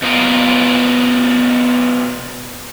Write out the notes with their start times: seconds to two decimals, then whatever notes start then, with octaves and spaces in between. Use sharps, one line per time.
0.02 B2 B3 F4 A#4